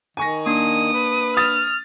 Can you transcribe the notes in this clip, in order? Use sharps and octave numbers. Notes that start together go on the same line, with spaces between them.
D#3 G#5 C#6 A#6
A#3 D4 D#6
B4
D#6 F6 A6